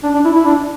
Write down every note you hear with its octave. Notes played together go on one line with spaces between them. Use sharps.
D4
D4
E4
E4
D4